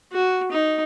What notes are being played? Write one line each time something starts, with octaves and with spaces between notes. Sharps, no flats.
F#4
D#4